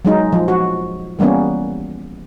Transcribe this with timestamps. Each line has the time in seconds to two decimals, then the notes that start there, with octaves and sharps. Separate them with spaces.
0.05 F#3 G#3 D#4
0.33 F3
0.48 F#4
1.19 E3 G3 A#3 B3 C#4